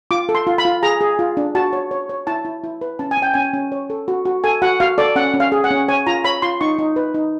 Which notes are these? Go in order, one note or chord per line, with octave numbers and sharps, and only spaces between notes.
F4 D6
A4
C6
F4
B5
F4
G#4 A#5
G#4
F4
D4
F#4 A5
C#5
C#5
C#5
E4 A5
E4
E4
B4
C#4 A5
G#5
C#4 G5
C#4 G#5
C#4
C#5
A4
F#4
F#4
A4 G#5
F#4 F#5
F#4 F5
A4 D5
C#4 F#5
C#4
F5
G#4
F#5
C#4
C#5 G#5
F4 A#5
C#5 B5
F4 C6
D#4 C#6
D#4
B4
D#4